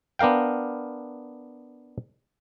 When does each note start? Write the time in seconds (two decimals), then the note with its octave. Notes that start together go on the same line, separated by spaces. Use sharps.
0.19 B3 D4 A#4 F5 G5